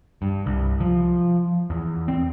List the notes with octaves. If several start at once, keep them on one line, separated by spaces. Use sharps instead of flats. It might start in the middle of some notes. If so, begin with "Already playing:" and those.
G2
C2
F3
E2
C4